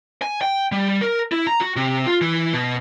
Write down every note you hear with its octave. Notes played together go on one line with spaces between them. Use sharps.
G#5
G5
G3
A#4
E4
A#5
F#4
C3
F4
E3
B2